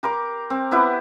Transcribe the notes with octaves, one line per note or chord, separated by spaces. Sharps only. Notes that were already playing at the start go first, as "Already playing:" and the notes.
G4 A#4 C6 D6
C4
B3 E4 G4 F#5